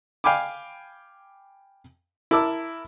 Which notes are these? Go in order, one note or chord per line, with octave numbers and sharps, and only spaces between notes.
F5 G5 G#5 B5 D6
E4 A#4 A5 D6 E6